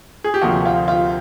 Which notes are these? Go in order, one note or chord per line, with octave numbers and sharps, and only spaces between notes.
G#4
G4
D2 C3 F3 A#3 F#4
F4
F4